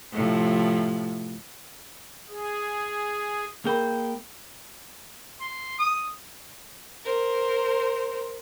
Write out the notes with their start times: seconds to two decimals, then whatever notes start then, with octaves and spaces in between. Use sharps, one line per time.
0.12 A2 C3 F3
2.29 G#4
3.65 A#3 G#4 A#4 G5 B5
5.40 C6
5.78 D#6
7.05 A#4 C5